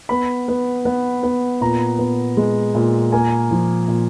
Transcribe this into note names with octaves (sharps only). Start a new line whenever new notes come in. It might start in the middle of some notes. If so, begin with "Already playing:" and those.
B3 B5
B3
B3
B3
A#2 A#5
B3
G#3
A#2
A#3 G#5
F3
A#2